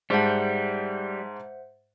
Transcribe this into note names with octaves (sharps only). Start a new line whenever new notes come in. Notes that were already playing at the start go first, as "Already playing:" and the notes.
G#2 G3 C5 E5 F#5 A5